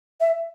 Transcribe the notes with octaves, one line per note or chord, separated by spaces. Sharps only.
E5